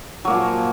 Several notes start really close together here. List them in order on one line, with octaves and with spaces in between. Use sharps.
F#3 A#3 A#2 F3